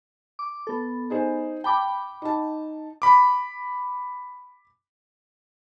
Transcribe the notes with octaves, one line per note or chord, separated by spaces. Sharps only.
D6
B3 A4
D#4 G#4 C5
G5 A5 B5 D6
D#4 A5
B5 D6